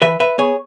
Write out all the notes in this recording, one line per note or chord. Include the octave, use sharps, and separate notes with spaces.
E3 B4 E5
B4 E5
B3 G#4 C#5